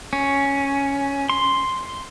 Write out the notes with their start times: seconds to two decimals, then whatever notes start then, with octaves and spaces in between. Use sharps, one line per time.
0.13 C#4
1.30 C6